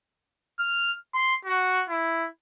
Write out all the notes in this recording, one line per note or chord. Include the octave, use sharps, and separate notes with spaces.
F6
C6
F#4
E4